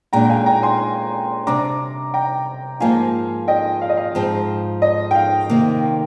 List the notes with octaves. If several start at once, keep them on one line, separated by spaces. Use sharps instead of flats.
A#2 G#3 D4 G5 A#5
G5
F5 G#5
G5 A#5
G#5 C6
C3 G3 D4 A#5 D6
G5 A#5
G#2 F3 A#3 F4 F5 G#5
D#5 G5
F5
D#5
F5
G#2 F3 G#3 C4
D#5
G5
F5
C3 D#3 A#3